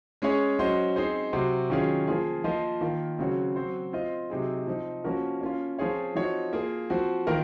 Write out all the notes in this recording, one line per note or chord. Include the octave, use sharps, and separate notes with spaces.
G#3 C#4 G#4 C#5
F#3 C#4 F#4 C5 D#5
C4 D#4 G#4 C5
C3 F#3 C4 F#4 C5
D#3 F#3 C#4 F4 G#4
F3 A#3 F4 G#4
F3 A#3 F4 C5 D#5
D#3 A#3 F4
C#3 F#3 C4 F#4 C#5
F#3 C4 F#4 C5
C4 F4 C5 D#5
C3 F#3 C4 D#4 G#4
F3 C4 D#4
F3 A#3 C#4 F#4 A#4
A#3 C#4 F4
F3 C4 F4 G#4 C#5
F3 C4 D#4 F#4 C#5
A#3 F4 G#4
F3 C4 F#4
D#3 A#3 F4 A#4